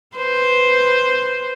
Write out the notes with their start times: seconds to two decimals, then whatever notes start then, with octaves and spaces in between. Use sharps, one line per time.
0.16 B4 C5